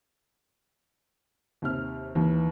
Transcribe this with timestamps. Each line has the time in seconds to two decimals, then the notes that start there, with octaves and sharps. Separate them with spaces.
1.62 D#2 C3 F6
2.15 D#2 E3